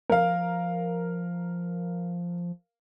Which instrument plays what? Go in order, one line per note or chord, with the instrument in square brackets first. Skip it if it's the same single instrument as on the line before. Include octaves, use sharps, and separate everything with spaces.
[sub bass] F3 [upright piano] A#4 F5